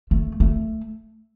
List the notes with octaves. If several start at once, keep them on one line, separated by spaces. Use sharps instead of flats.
A3
A3